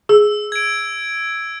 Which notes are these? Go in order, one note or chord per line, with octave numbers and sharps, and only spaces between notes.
G#4 E6
G#6 D7